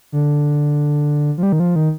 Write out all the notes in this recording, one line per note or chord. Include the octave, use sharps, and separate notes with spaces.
D3
F3
G3
D#3
F3
D#3